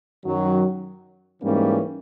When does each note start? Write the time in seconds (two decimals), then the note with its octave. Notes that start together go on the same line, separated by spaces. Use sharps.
0.24 F#2 D#3 F#3
1.42 G#2 E3 G3 A#3 C#4